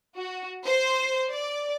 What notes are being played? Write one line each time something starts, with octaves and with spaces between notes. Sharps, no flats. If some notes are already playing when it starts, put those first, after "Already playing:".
F#4
C5
D5